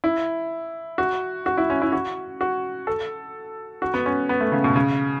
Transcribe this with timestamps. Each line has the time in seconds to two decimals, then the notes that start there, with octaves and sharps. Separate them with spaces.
0.04 E4
0.98 F#4
1.46 F#4
1.57 E4
1.70 C#4
1.82 E4
1.92 F#4
2.41 F#4
2.87 A4
3.82 F#4
3.94 B3
4.06 C#4
4.29 B3
4.40 A3
4.52 C#3
4.64 B2
4.76 C#3